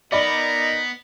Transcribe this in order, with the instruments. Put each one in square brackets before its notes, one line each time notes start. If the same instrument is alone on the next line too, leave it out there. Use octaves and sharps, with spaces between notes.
[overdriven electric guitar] B3 [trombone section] D#4 [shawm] A#4 [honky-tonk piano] D5 D#5 B5